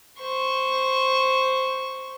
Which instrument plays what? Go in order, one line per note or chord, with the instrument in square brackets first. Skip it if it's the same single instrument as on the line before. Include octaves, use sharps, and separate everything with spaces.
[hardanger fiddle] C5 C#6